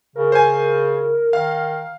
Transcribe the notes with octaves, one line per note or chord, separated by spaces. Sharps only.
C#3 A#4
C5 G#5
D#3 F5